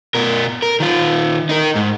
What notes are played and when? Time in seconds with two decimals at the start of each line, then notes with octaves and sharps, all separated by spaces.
0.15 B2 A#4
0.62 A#4
0.80 D#3 F4
1.49 D#4 A#4
1.75 G#2